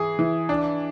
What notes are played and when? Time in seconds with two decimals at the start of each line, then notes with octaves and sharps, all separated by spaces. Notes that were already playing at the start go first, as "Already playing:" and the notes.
Already playing: E3 G#4
0.19 E3
0.49 D4